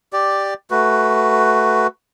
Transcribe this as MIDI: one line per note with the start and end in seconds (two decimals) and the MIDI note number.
0.13 0.54 67
0.13 0.54 74
0.71 1.87 57
0.71 1.87 66
0.71 1.87 71